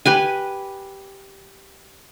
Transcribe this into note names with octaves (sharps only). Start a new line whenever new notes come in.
G4 B4 G#5